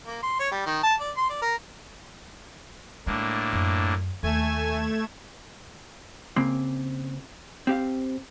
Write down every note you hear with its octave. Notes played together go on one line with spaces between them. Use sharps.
A#3
C6
C#5
G3
D#3
A5
D5
C6
D5
A#4
A2 G#3 A#3 D4
F#2
D#2 A3 G#5 G#6 E7
C#3 A#3 C4
C4 G4 F5